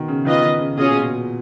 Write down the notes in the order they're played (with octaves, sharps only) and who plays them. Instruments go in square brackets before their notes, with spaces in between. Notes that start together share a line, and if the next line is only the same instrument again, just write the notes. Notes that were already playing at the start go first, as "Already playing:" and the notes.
Already playing: [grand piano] B2 D#3
C#3
[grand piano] D#3 [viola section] B3 F4 B4 D#5
[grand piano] D#3
C#3
[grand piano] B2 [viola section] C#4 F4 G#4 D#5
[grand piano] A#2
B2